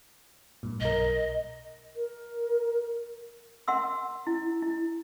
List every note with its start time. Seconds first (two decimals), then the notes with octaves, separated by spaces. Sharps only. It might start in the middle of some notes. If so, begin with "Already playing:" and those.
0.63 G2 A#2
0.81 B1 A#4 D#5
1.96 A#4
3.68 A#4 F#5 C6 E6
4.27 E4
4.62 E4